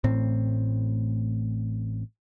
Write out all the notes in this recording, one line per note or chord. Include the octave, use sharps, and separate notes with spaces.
A1 A2 C4